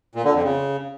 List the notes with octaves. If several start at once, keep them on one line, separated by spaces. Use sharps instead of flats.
A#2
D3
F2
C#3